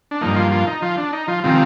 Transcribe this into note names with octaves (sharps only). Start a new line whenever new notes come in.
D4
G2 F3 A#3 D#4
F3 F4
F3 F4
D#4
F3 F4
D4
D#4
F3 F4
C3 D#3 F3 G#3 C4 F4